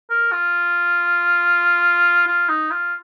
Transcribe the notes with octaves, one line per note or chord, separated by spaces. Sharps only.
A#4
F4
F4
D#4
F4